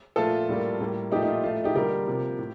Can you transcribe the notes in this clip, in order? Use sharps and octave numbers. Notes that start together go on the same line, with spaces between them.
A#2 F3 A3 F4 A4
A2 G3 A#3
A2 G3 A#3
A#2 F3 A3 D#4 G4
D#4
F4
A2 F3 A3 F4
D#4 G4
D3 G3 A#3 G4 A#4
C3 F3 A#3
A2